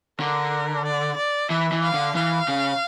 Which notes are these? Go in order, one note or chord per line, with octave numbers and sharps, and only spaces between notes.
D3 A#4
D5
D5
E3 E5
E3
F5
D3
E3 F5
C#3